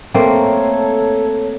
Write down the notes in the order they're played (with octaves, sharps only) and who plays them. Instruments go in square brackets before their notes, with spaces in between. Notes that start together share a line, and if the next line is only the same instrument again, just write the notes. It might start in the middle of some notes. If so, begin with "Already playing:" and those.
[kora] A3 A#3 C4 [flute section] A4 C#5